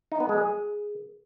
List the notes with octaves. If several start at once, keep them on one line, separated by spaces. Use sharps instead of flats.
D#4
B3
G#3
G#4